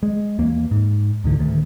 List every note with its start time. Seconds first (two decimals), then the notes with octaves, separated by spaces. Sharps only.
0.03 G#3
0.38 D#2 E3 A#3
0.71 G#2
1.24 D2 G#2 D3 E3
1.38 D1 D2 D#3 A3